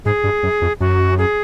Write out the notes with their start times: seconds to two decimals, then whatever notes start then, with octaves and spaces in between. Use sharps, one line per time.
0.05 G#2 G#4
0.24 G2
0.43 F#2
0.62 F2
0.80 F#2 F#4
1.18 G#4